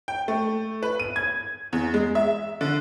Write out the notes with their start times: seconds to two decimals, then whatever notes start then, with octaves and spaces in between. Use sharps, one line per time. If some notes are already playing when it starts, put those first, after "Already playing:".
0.08 G5
0.28 A3
0.83 B4
0.99 D#7
1.16 G#6
1.73 E2
1.94 G#3
2.15 E5
2.61 D3